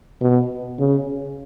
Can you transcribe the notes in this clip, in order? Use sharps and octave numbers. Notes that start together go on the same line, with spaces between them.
B2
C#3